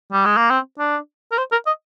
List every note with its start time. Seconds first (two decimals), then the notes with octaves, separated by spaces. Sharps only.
0.12 G3
0.25 G#3
0.37 A#3
0.50 C4
0.79 D4
1.31 A#4
1.38 C5
1.52 A#4
1.66 D#5